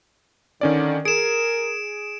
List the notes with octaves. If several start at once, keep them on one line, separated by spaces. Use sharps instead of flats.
D3 D#3 C#4 D5
G#4 A#4 D7 E7